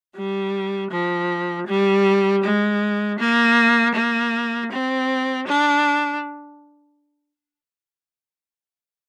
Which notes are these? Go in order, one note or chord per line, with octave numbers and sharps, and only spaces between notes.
G3
F3
G3
G#3
A#3
A#3
C4
D4